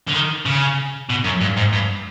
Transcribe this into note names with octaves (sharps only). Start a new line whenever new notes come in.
D3
D#3
C#3
B2
F#2
G2
G#2
G2